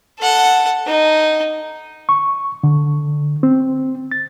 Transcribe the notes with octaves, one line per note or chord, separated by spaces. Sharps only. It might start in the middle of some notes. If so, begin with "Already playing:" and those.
A4 F#5
D#4
C#6
D3
C4
A6